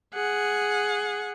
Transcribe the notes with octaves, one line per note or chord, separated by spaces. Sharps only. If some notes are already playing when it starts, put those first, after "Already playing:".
G#4 F#5